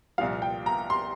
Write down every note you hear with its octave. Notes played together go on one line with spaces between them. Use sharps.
C2 A#2 F3 F5
G5
A#5
C6